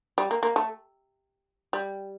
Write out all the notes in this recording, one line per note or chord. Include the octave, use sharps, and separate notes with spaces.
G3
A#3
A#3
A3
G3